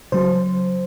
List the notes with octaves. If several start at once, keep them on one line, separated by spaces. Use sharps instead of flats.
C#3 F#3 C5